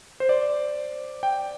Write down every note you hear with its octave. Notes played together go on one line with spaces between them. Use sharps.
C5
D5
G5